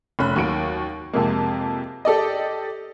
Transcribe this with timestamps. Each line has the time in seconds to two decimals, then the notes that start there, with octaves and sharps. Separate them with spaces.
0.19 F1 C#4 B5 F#6
0.36 D#2 F#3 F#4 D7
1.13 F2 C3 G#3 A#3
2.05 G4 A4 D5 D#5